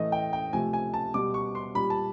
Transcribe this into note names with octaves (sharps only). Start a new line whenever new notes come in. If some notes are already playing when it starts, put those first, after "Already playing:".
Already playing: A2 E3 A3 D#5
G5
G5
C3 F3 A3 G#5
G#5
A5
B2 G3 D6
C#6
C6
A#2 G3 B5
A5